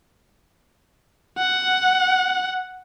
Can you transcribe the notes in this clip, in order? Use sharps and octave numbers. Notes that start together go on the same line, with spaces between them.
F#5